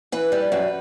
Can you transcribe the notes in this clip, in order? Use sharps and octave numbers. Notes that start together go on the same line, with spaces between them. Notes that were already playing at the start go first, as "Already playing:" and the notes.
E3 B4
G3
F#2 B4